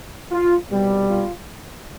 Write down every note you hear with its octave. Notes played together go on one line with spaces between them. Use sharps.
F4
C2 B2 G3
F4